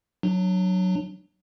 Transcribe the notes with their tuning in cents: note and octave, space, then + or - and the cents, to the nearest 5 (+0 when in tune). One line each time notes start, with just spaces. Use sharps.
F#3 +0 D4 +25